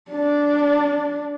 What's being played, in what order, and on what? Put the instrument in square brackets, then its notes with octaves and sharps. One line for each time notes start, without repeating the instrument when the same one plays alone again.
[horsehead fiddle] D4